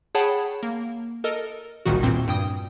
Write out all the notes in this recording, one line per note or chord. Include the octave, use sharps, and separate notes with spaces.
G#4 C#5 F#5 G5 A5 B5
A#3
A4 A#4 D#5
G1 C2 A#2 D#3 F#4
E2 A#2 C4
G2 G5 D#6